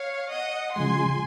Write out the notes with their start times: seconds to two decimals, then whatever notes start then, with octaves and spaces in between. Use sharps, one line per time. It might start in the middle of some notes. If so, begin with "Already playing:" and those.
Already playing: C#5 F5
0.32 D#5 F#5
0.76 C#3 F3 G#3 G#5 C6